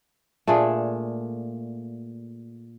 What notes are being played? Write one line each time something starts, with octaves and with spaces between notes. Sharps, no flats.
A#2 A3 D4 G#4